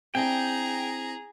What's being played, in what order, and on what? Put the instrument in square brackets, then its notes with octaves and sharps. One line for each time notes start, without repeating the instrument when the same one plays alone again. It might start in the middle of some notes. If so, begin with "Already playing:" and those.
[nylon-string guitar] C4 D4 E4 [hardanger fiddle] G#4 A#5 [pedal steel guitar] G5